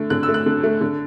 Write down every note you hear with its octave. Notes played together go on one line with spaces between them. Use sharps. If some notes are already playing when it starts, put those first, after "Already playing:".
Already playing: D3 A3
D3 F#6
E6
A3
F#6
D3
A3
D3